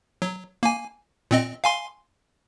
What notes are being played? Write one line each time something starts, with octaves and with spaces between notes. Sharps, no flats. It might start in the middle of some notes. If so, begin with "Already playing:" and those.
F#3
A#3 G#5
A#2 C4 D#5
F5 G#5 C6